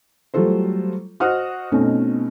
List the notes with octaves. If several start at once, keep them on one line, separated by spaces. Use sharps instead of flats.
F#3 G3 A3 F4 A4 C5
F#4 C5 D#5 F#5 D#6 F6
B2 A3 C4 C#4 D#4